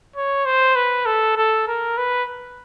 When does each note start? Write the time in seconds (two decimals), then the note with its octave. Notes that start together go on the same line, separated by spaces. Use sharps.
0.16 C#5
0.45 C5
0.75 B4
1.06 A4
1.36 A4
1.67 A#4
1.98 B4